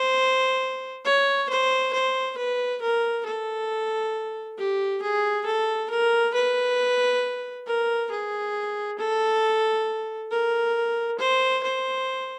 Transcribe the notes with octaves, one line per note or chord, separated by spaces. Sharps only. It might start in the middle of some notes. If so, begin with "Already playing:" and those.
Already playing: C5
C#5
C5
C5
B4
A#4
A4
G4
G#4
A4
A#4
B4
A#4
G#4
A4
A#4
C5
C5